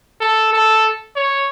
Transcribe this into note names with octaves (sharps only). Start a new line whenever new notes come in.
A4
A4
C#5